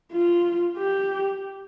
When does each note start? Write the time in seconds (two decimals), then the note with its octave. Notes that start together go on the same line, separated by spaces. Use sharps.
0.12 F4
0.78 G4